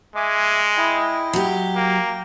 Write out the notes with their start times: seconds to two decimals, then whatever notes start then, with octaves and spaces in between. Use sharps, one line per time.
0.16 G#3 E5 G#5 D6
0.77 E4 D#5 G5
1.33 F#3 G4
1.76 A#3 G5